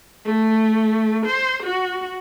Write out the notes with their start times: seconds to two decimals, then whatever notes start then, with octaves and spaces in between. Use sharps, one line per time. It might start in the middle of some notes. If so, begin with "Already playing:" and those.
0.25 A3
1.26 C5
1.63 F#4